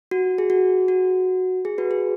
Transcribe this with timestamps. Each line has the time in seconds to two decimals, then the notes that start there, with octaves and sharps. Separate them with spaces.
0.11 F#4
0.38 G#4
0.50 F#4
0.88 F#4
1.65 G#4
1.78 F#4 B4
1.91 G#4